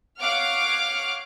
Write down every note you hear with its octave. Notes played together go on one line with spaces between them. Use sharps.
C#5 F5 F#5 D6 F6